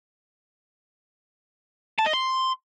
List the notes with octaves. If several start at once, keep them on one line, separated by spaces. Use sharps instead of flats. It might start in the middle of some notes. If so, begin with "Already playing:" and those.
A5
D#5
C6